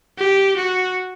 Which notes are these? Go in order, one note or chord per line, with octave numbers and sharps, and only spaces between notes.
G4
F#4